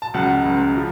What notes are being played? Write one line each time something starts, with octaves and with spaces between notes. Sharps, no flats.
A5
C#2 C#3 F#3 F#5
C#2 C#3 F#3
C#3 F3